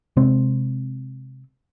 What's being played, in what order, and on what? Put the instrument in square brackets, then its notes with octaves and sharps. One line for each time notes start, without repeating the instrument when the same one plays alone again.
[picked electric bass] C3 G#3 C4